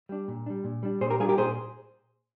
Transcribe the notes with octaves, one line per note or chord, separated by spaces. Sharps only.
G3 D4
A#2
G3 D4
A#2
G3 D4
A#2 G#4 C5
G4 A#4
G3 D4 F4 G#4
G4 A#4
A#2 G#4 C5